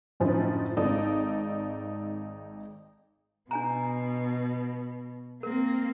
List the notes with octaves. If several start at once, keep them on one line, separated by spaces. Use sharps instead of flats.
F#2 A2 D3 F3 C4 D#4
G#1 D#4 A4 D5
B2 D4 G#5 A#5
A#3 C4 A#4